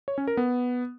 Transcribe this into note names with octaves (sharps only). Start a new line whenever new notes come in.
C#5
C#4
A#4
B3